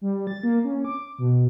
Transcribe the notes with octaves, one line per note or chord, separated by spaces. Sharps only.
G3
A6
A#3
C#4
D6
B2